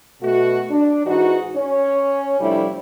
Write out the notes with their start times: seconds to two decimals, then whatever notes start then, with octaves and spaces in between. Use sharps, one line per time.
0.22 B2 A3 F#4
0.69 D4
1.06 G#2 E3 D#4 F#4
1.55 C#4 C#5
2.39 C3 F3 G3 A3 D4 E4